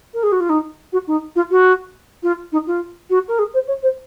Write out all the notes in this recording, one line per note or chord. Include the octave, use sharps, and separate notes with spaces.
A#4
G#4
F#4
F4
D#4
F#4
D#4
F4
F#4
F4
D#4
F4
F#4
A#4
G#4
C5
C#5
C5